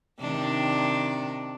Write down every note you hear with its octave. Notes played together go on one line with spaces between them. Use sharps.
C3 D#3 D4